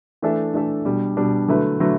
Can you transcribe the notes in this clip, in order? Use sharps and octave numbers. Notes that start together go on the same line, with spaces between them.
E3 A3 D4 A4 E5
E3 A3 D4 A4 E5
B2 G3 D4
B2 G3 D4
D3 F#3 A3 E4 B4
D3 F#3 A3 E4 B4